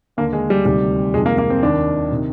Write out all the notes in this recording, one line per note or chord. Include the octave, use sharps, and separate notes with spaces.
D#2 D3 A#3
G#3
G3
D2 C3 D#3 G3
F2 C3 D#3 G#3
A#3
A#3
C4
D#2 D#3 D4
C3 D#3